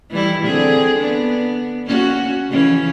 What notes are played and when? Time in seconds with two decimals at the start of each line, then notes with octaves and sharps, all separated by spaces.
0.11 E3 G3 E4
0.43 D3 C4 G#4
0.99 B3 D4
1.86 A#3 C#4 F#4
2.49 C#3 E3 C#4